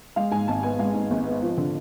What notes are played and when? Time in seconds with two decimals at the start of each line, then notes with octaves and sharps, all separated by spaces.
0.16 G#3 F5
0.31 G#2 G#5
0.48 G#1 A5
0.63 B3 G#5
0.79 G#3 F5
0.94 G#2
1.10 G#1
1.26 B3
1.42 F3
1.57 D3